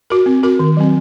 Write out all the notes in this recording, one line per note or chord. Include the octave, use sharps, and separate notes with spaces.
F#4 A#4
C4
F#4 A#4
D#3
F#3 C4